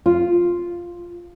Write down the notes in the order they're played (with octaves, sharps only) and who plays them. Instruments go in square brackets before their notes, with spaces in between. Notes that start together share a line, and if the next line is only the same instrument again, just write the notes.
[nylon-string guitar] F4